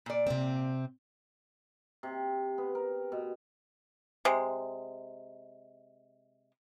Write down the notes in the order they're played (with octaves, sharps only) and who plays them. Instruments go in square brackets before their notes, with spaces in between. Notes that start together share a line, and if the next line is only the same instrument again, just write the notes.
[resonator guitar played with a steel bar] A#2 D5
[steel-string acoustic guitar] C3 C4
[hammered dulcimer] C3
B3
A#4
B2
[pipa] C3 G#3